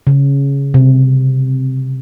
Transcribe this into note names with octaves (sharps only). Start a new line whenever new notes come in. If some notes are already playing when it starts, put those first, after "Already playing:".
C#3
C3